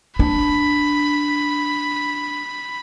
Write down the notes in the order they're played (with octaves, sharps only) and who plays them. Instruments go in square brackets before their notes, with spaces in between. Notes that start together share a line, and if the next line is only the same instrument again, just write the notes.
[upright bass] D4 [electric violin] B5